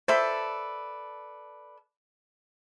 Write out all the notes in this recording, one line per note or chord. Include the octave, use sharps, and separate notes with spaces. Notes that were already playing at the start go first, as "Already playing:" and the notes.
A4 B4 C5 D5 E5